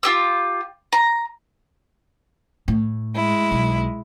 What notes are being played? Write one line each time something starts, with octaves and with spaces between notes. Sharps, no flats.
F4 G4 E6
A#5
A2
G#3 E4
B1